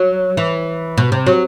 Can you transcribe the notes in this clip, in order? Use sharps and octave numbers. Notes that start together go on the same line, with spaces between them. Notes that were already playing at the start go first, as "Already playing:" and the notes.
Already playing: F#3
E3
B2
C3
F#3